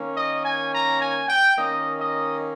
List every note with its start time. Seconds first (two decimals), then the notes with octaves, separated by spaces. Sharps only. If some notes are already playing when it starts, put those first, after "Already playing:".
Already playing: D#3 A#3 C#4
0.17 D#5
0.45 G#5
0.73 A#5
1.01 G#5
1.29 G5
1.57 D#3 A#3 C#4 D#5
1.99 D#5